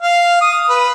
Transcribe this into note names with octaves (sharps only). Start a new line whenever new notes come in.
F5
D#6
B4